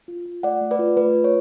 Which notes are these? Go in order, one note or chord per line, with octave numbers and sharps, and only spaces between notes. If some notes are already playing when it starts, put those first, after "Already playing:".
F4
F4
A3 D5 F#5
A3
B4 D5
F4
A3 B4
F4
C#5